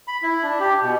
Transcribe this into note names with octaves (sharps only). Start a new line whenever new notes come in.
B5
E4
D4
G4
B2